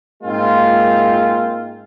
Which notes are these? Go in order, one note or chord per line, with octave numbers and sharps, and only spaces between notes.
G#2 G#3 A#3 C4 F4